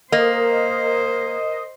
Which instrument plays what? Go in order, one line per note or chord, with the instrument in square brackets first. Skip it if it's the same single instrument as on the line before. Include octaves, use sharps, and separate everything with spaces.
[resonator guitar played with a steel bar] A#3 [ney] A#4 [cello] C5 [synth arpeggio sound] D#5